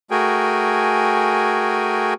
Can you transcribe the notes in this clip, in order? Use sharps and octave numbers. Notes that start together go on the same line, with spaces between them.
A3 F#4 G#4 A#4 G5 G#5